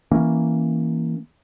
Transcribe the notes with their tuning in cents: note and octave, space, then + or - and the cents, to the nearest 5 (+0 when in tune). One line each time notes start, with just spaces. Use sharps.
E3 +0 A#3 +0 C#4 -15